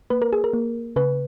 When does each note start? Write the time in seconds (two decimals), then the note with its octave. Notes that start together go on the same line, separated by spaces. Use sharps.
0.10 A#3 B4
0.22 A#4
0.33 G#4
0.44 A#4
0.53 A#3
0.96 C#3 B4